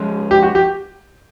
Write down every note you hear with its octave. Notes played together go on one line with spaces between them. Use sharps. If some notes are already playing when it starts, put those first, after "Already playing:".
Already playing: F3 G#3 C#4
G4
F#4
G4